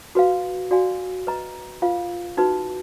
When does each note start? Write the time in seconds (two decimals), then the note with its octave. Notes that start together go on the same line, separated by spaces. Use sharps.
0.15 F#4 B4 F5
0.71 F#4 D5 F5 G#5
1.27 B4 D#5 A#5
1.82 F4 B4 F5
2.37 D#4 F#4 B4